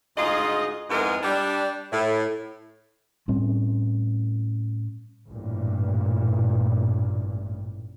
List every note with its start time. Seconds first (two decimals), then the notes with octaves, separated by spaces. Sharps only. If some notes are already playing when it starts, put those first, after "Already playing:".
0.17 D2 G#2 F4 G#4 D#5
0.90 F2 G#2 G#3 B3 E4 A#4
1.23 G3 D4
1.92 A2
3.28 A2 G3 C4 C#4
5.29 A1 G2 A#2